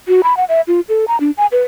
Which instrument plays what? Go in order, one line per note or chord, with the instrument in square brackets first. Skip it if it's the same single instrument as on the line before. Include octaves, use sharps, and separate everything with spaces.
[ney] F#4
B5
F#5
E5
F4
A4
A#5
D4
G#5
B4